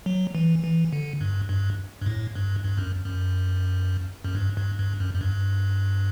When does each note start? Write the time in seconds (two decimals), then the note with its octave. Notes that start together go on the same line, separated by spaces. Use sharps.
0.06 F#3
0.35 E3
0.64 E3
0.93 D3
1.21 G2
1.49 G2
2.01 G2
2.06 A2
2.35 G2
2.64 G2
2.78 F#2
3.05 F#2
4.25 F#2
4.35 G2
4.57 G2
4.79 G2
5.00 F#2
5.14 F#2
5.21 G2